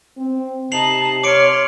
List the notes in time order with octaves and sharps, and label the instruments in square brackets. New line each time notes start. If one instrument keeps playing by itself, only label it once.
[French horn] C4
[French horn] C3 [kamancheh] D#4 A5 [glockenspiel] C7 F7 F#7
[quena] C#5 [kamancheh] C6 F6 [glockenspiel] D6 C#7 D7